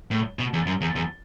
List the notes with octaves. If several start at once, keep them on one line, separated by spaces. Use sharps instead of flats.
A2
B2
E2
F#2
E2
E2